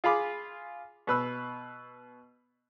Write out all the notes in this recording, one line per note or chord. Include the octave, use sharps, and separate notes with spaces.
F4 G#4 F5 B5 D6
B2 B4 E6